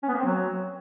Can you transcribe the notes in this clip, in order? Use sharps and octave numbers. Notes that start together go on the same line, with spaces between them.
C#4
B3
A#3
C4
F#3